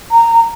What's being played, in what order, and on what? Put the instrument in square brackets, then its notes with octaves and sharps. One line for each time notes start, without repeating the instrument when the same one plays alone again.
[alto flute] A#5